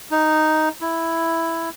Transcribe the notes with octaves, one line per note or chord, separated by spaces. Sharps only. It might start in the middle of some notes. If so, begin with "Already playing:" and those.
D#4
E4